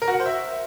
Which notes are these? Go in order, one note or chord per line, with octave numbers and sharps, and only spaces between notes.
A#4
F#4
F#5
C5
E5